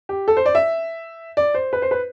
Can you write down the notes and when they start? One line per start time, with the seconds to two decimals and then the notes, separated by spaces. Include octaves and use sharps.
0.09 G4
0.28 A4
0.37 C5
0.46 D5
0.55 E5
1.37 D5
1.54 C5
1.73 B4
1.82 C5
1.91 B4